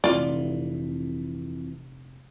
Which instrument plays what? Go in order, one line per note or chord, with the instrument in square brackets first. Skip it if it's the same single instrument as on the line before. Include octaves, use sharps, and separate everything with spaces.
[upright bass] F1 A#1 [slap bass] F2 E3 [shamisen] F4 D5